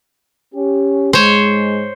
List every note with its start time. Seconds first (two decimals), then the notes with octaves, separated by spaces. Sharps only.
0.54 C#4 G4
1.13 G#2 G#3 C5 C#5